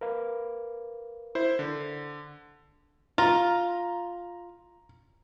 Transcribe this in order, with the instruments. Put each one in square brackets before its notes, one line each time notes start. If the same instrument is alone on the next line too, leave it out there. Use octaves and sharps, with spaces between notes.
[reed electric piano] A#4 B4 F5
[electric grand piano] E4 C5
D3
[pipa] F4 [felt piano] A#5